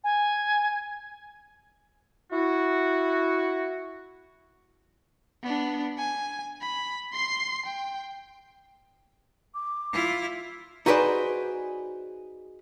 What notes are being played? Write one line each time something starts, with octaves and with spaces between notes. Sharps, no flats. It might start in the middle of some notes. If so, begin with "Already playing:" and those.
G#5
E4 F#4
B3 D4
G#5
B5
C6 C7
G5
D6
E4 F4
D#4 F#4 G#4 B4 C5 D5